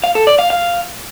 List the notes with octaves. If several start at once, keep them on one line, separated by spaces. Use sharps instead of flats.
F5
A4
D5
F5
F5